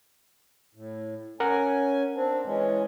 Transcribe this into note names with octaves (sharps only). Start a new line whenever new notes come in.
A2
C#4 A#4 F#5 G#5
C4 D4
E3 G#3 C#4